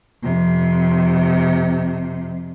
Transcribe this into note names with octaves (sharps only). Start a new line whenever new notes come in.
F2 C3